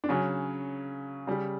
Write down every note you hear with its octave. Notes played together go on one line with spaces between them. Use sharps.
D4
C#3 F#3 C#4
C#3 G3